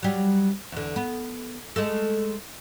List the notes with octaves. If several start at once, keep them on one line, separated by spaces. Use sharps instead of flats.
F#3 G3
E2 D3
B3
G#3 A3 A4